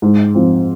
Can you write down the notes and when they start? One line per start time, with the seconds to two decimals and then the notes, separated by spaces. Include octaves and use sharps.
0.02 G#2
0.35 F3 C4